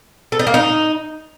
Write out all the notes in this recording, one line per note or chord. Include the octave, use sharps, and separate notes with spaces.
A4
D#4
A#3
D#4